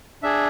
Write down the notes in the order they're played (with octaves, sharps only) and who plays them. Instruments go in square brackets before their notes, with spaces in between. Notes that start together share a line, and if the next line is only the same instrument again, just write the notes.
[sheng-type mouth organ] D4 G#4 E5